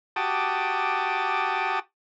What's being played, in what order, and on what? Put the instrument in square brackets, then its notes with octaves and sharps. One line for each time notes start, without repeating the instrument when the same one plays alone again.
[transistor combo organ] F#4 G4 A5 D6 D#6